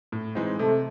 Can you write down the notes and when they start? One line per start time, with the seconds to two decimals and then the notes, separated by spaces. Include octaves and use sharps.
0.12 A2
0.35 E3 G#3 C4 D#4
0.59 C3 A3